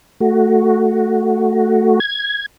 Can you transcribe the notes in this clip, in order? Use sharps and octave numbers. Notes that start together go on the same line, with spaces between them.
A3 F#4
G#6